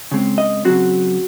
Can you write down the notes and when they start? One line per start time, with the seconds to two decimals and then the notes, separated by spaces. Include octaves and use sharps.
0.11 C#3 G#3 C4
0.38 D#5
0.65 C#3 F#3 C4 F#4